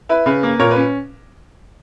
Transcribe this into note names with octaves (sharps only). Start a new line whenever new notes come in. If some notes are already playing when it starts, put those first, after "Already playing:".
E4 B4
C#3 B4
A#3
A#2 A#4 C#5
B4
C#4